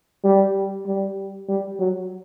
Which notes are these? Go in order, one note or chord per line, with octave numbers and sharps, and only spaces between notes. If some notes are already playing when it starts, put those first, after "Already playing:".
G3
G3
G3
F#3